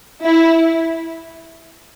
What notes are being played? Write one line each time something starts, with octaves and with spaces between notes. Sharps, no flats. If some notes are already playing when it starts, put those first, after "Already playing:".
E4